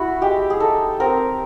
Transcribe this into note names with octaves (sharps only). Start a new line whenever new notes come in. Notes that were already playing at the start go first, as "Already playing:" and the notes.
Already playing: E4 F#4
G#3 G4
G#4
D#4 A4
C4 A#4